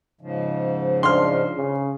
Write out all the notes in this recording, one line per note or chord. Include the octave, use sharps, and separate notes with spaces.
G#2 C#3 F3
D4 C6 F6
C#3